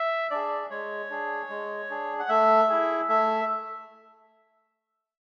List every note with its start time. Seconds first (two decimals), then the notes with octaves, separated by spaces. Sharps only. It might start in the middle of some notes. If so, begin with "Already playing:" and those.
Already playing: E5
0.30 D4 G#4 D5
0.70 G#3 C#5
1.10 D4 G#4
1.50 G#3
1.90 D4 G#4
2.20 F#5
2.29 A3 E5
2.69 E4 G#4
3.09 A3 E5